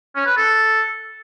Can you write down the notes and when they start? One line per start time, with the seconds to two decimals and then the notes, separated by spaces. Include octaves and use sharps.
0.16 C#4
0.26 B4
0.37 A4